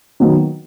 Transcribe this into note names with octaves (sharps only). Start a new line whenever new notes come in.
D#3 F#3 B3